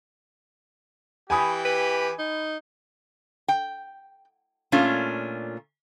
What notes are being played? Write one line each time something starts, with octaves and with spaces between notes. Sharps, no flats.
E3 G4 G#5 B5 D#6
B4
D#4
G5
A#2 A3 C#4 D4 F4